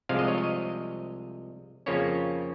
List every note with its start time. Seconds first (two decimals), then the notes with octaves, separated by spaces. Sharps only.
0.09 C2 C3 F3 G#3 F5
0.19 D#5
0.28 C#5
0.38 D#5
1.86 F2 C#3 F3 A#3 C#4 C#5